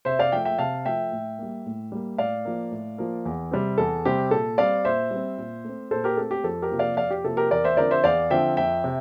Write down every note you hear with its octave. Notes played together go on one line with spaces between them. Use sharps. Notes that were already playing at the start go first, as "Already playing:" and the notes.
C3 C5 E5
D5 F5
F3 A3 E5 G5
E5 G5
C3 F5 A5
F3 A3 E5 G5
A2
G3 A#3
A2
G3 A#3
A2 D5 F5
F3 A#3
A2
F3 A#3
E2
C3 G3 C4
E2 A4
C3 G3 C4 G4
A#2 A4
G3 C4 D5 F5
A#2 C5 E5
G3 C4
A#2
A3 C4
A#2 A4 C5
G4 A#4
A3 C4 A4
G4
F2 A4
G4 A#4
C3 F3 A#3
D5 F5
F2 D5 F5
G4
C3 F3 A#3 A4
G4 A#4
E2 A#4 D5
C5 E5
D3 F3 C4 A#4 D5
C5 E5
E2 D5 F5
D3 F3 C4 E5 G5
F2 E5 G5
C3